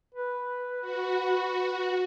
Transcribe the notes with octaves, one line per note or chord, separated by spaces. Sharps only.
B4
F#4